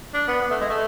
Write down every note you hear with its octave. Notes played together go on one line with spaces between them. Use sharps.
D4
B3
B3
A3
G#3
A3